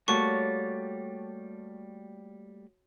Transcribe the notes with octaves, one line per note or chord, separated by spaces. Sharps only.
G3 A3 A#3 F#4 C#5 A5 C#6